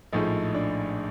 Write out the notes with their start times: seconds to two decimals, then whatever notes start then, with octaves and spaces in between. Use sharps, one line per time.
0.12 A#1 A2 F3 G#3 D#4
0.54 D4